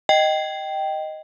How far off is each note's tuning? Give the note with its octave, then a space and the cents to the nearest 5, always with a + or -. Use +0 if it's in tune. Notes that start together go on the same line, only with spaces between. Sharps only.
D#5 +0 G5 -10